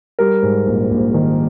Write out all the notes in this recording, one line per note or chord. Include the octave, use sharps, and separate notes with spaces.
G3 A#4
G#2
A#1
A#1
D#3